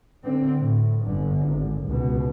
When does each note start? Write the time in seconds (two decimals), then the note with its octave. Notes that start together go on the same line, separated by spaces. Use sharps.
0.24 D3 C4
0.60 A2
1.04 G1 D3
1.45 G#1
1.87 C#2 B2